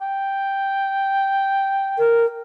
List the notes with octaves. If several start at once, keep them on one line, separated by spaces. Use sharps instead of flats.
G5
A#4